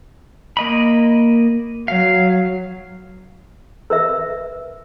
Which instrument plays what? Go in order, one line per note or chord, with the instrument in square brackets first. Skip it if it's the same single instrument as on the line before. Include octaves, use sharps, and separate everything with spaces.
[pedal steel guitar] A#3 D#5 B5
[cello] F#3 [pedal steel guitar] F5
[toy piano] A#4 B4 E5